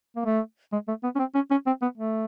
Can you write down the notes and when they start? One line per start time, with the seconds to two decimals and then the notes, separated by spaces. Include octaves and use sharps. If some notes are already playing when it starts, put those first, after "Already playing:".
0.16 A#3
0.26 A3
0.73 G#3
0.88 A3
1.04 B3
1.16 C#4
1.19 C4
1.35 C#4
1.51 C#4
1.67 C4
1.82 B3
1.98 A3